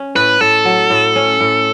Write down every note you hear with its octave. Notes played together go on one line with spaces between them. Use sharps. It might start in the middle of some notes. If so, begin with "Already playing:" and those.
Already playing: C#4
A2 B4
A2 A4
F#3
A2
C#4
A2